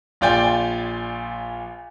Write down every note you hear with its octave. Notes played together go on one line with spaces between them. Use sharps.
A#1 F4 D5 G5 G#5